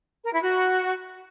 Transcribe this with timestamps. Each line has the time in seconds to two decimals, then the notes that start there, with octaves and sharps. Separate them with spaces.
0.23 A#4
0.33 E4
0.42 F#4